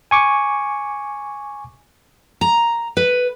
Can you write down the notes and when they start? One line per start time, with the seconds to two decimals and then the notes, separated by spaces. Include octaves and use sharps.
0.11 G#5 C#6 D6
2.41 A#5
2.97 B4